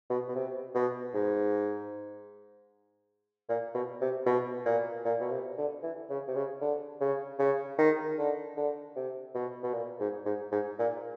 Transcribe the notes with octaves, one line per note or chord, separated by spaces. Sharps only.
B2
B2
C3
B2
G#2
A#2
B2
C3
B2
A#2
A#2
B2
C3
D3
E3
C#3
C3
C#3
D3
C#3
C#3
D#3
D3
D3
C3
B2
B2
A#2
G#2
G#2
G#2
A#2